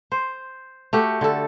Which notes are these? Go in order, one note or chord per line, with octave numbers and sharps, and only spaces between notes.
C5
A3 F#4 G4
D3 A4